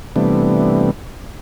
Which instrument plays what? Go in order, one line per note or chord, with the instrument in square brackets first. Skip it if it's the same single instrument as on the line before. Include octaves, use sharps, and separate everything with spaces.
[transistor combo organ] C3 E3 G3 A3 B3 D4